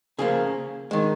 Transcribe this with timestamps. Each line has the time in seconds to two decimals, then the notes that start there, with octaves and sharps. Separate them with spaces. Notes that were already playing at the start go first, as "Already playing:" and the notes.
0.18 C#3 F3 A#3 G#4
0.91 D#3 G#3